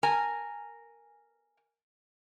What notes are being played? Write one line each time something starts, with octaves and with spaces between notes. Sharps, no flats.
A#4 G#5